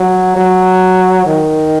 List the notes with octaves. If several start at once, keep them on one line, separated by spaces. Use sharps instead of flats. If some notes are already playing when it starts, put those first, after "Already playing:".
Already playing: F#3
F#3
D#3